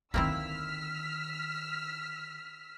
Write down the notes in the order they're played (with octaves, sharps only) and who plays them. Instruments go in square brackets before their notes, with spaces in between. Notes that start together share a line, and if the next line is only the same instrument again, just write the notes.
[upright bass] D3 D#3 [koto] A#3 C4 E4 [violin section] E6 F6 B6